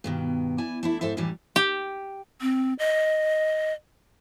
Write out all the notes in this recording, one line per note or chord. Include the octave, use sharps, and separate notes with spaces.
G2 B2 D#3
E4 D5 G#5
A3 D4 E4
G#2 A4 C5 E5
F#2 A2 D#3 E3 G3 D4
G4
C4
D#5